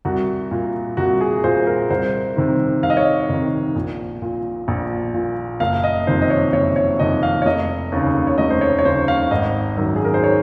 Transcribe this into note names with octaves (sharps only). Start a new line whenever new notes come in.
C2 F#4
A#2
C2 F#4
G#4
A#2 C5
A#4
C2 C5
C3 D#3
C2 F5
D#5
C#5
D#5
C3 D#3
A#1
A#2
A#1
A#2
F#1 F5
D#5
F2 C3 D#3 C5
D#5
C#5
F#1 C#5
C#5
F2 C3 D#3 D#5
F5
C#5
F1 D#5
D#2 C#3
C#5
F1 D#5
C5
C#5
C#5
D#2 C#3 C5
F5
G#1 D#5
F#2 D#3
G#4
A#4
C5
C#5